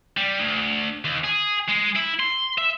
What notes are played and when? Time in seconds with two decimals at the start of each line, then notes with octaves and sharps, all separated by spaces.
0.17 G3
0.39 D2
1.05 D#2
1.24 G#4
1.69 G#3
1.96 E4
2.20 C6
2.58 E5